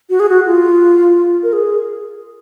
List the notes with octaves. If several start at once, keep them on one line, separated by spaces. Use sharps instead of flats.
F#4
G#4
F#4
F4
A#4
G#4